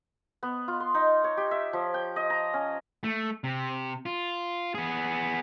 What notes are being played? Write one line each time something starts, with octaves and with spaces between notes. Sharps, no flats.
B3
F4
C6
D#4
C#5
G4
E5
F3
G5
D#5
A#5
C#4
A3
C3
F4
B3 G#4